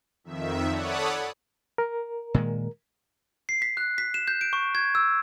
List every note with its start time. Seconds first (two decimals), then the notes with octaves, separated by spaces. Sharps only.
0.24 F2 D#3 E5
0.68 A4 C#5 D5 F#5 B5 D#6
1.78 A#4
2.34 A#2 D#3 G#3
3.49 C7
3.62 B6
3.77 F#6
3.98 B6
4.14 E7
4.28 G6
4.41 D7
4.53 C#6
4.75 G#6
4.95 E6